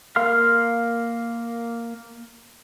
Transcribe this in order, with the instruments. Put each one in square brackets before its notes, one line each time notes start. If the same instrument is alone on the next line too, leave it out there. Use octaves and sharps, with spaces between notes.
[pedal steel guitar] A#3 A#4 F5 C6 F6